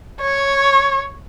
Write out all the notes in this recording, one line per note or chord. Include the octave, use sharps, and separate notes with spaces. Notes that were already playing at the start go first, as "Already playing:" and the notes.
C#5